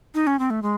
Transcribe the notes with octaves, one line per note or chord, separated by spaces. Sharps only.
D#4
C#4
C4
A3
G#3